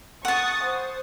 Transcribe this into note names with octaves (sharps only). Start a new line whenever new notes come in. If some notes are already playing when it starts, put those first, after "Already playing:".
F#5 A5 C#6 D#6 A6
C5